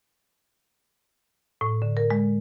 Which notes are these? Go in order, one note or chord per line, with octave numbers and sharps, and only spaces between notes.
A2
D3
A#4
G#3